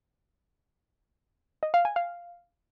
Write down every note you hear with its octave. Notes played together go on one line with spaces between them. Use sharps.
D#5
F5
G#5
F5